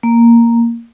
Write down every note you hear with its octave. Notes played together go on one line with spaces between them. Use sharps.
A#3